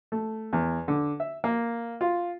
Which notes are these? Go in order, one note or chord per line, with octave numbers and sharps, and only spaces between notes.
A3
E2
D3
E5
A#3
F4